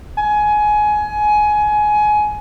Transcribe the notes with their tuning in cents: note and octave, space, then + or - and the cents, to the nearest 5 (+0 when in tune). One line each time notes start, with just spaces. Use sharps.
G#5 +20